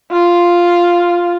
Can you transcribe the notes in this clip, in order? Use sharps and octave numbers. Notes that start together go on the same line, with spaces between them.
F4